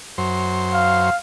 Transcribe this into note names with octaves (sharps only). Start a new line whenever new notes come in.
F#2 C5
F5